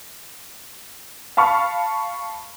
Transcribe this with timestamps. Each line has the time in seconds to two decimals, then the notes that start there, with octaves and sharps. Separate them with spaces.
1.37 F5 A5 B5 C#6 F6